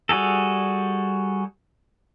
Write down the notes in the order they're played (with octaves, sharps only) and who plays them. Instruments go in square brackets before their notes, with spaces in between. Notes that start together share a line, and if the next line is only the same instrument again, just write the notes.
[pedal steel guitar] G3 F#4 G#4 A4